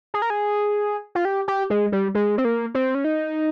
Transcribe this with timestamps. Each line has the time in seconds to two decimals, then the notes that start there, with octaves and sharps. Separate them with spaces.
0.14 G#4
0.22 A#4
0.30 G#4
1.15 F4
1.25 G4
1.48 G4
1.70 G#3
1.92 G3
2.15 G#3
2.38 C4
2.45 A#3
2.74 C4
2.95 C#4
3.04 D#4